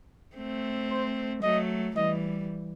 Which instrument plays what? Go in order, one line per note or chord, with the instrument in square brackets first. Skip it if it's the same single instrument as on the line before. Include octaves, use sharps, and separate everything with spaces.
[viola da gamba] A3 C4
[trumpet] C5
[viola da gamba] F#3 A3 [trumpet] D#5
[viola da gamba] E3 G3 [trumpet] D#5